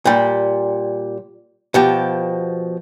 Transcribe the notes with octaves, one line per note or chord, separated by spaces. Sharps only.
A#2 G3
B2 F3 G4